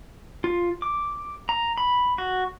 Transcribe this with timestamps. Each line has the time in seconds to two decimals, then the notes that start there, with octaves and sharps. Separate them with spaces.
0.44 F4
0.82 D6
1.49 A#5
1.78 B5
2.18 F#4